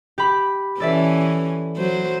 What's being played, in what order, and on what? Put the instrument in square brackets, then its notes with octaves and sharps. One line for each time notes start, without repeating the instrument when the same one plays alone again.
[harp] G4 B5
[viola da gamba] E3 C#4 [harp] A4 D5 E5
[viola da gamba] F#3 C5